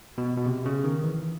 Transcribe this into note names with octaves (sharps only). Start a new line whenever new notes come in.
B2
B2
C3
C#3
D#3
E3